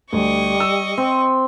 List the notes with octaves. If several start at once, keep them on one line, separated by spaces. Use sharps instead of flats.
D2 G3 D#5 C#6
E6
C4